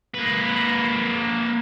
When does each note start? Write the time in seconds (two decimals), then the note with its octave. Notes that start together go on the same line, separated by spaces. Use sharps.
0.14 A#3 B4